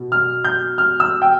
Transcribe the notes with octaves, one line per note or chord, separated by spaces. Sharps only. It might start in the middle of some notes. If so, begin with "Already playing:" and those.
Already playing: B2
F6
G6
F6
E6
G5